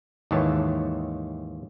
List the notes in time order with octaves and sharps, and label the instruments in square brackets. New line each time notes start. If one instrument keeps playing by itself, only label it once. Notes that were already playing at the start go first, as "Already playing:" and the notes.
[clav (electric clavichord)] D#2 G#2 D#3 E3 C#5 A5